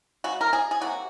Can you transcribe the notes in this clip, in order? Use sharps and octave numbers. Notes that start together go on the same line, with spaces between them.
C#3 G#3 F#4
A#4
G#4
G#4
C3 F#3 A#3 F#4